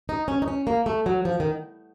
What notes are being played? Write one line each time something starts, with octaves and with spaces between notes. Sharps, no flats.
D#4
C#4
D#4
C#4
A#3
A3
F#3
F3
D#3